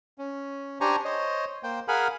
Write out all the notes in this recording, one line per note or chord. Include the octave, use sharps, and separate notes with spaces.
C#4
D4 G4 C5 G#5 A#5 C#6
C5 C#5 D#5
A#3 C5 G5
G#4 A#4 F5 F#5 G#5 B5